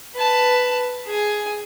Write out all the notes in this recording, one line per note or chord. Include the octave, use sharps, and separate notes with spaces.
B4 A5
G#4 G#5